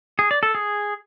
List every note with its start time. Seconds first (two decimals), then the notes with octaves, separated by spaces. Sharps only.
0.19 G#4
0.31 D5
0.43 A4
0.55 G#4